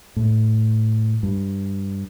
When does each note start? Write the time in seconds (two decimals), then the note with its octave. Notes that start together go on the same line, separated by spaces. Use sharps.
0.16 A2
1.23 G2